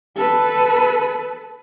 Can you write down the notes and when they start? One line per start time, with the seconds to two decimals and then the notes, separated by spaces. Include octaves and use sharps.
0.17 A4 B4